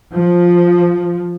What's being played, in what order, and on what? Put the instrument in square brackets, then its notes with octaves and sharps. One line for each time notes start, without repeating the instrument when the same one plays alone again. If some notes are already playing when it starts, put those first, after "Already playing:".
[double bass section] F3